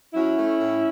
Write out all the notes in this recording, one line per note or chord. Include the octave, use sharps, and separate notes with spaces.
F#3 C#4 E4
A3
A2